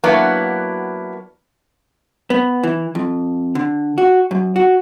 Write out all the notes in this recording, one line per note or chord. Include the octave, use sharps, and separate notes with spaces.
F#3 A#3 B3 D4 E4 F#4
B3
E3
F2
D3
F#4
F#2
F#4